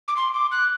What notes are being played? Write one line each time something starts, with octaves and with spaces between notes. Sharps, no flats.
D6
C6
D6
F#6